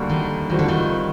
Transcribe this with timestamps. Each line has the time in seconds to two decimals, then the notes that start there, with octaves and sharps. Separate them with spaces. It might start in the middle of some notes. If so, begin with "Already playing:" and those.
Already playing: D2 D3 G3 A#3 F#4
0.09 D#3
0.50 A#2 D#3 G3 C4 F#4
0.59 D3
0.68 D#3